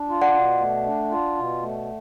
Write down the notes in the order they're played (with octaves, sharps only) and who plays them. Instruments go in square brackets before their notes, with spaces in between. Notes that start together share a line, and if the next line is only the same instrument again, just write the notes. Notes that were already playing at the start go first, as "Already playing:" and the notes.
Already playing: [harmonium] D4
F4
[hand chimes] D5 F#5
[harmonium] B2
A3
D4
F4
B2
A3